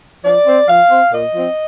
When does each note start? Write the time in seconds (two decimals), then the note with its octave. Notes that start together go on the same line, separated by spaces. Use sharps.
0.24 F3 D5
0.46 C4
0.67 F3 F5
0.89 C4
1.11 A#2 D#5
1.34 F3 C4